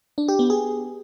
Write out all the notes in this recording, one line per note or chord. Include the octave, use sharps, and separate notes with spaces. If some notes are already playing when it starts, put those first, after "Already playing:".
D4
G4
B3
G#4